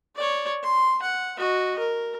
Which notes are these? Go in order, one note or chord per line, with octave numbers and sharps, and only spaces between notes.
C#5 D5
C6
F#5
F#4 D#5
A#4